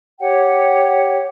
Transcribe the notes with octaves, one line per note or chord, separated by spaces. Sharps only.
G4 C#5 F#5 G5